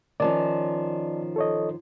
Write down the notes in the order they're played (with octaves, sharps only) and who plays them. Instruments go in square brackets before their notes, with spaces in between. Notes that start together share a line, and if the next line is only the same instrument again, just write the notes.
[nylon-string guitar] D#3 F3 C#4 [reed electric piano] D5 D#5 A5
[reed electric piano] A4 C#5 D#5